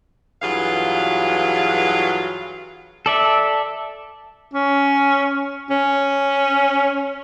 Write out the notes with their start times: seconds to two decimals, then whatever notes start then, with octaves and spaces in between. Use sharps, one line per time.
0.42 G2 E3 F#3 F4 G#4 F5
3.06 A4 D5 E5
4.53 C#4
5.70 C#4